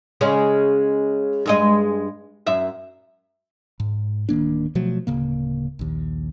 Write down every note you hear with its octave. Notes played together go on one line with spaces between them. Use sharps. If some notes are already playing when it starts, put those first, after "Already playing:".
C#3 G#3 C#4
G2 G#3 D#5
F#2 E5
G#2
D1 D#3 A#3 D4
B2 F3 F#3 A3
D1 C#3 A#3
A#1 D#2